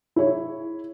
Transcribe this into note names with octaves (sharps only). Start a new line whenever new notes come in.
E4 G#4 C#5